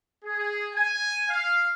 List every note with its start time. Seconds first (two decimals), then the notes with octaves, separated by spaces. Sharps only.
0.24 G#4
0.75 G#5
1.30 F5